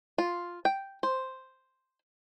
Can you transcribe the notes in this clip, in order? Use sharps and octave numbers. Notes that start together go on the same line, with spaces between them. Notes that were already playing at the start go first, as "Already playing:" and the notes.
F4
G5
C5